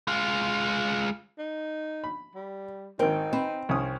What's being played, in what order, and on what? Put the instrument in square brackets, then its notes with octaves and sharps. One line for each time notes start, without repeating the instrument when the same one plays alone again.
[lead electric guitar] G#3 F4
[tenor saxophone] D#4
[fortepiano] B5
[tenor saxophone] G3
[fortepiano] G#1 C4 [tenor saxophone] D#4 [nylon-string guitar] A#4 G5
[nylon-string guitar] C4 [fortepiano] B4
[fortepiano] C2 C#4 D#6